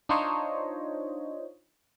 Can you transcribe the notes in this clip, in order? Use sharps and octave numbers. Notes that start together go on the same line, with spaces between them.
D4 D#4 F4 C5 C#5 D#5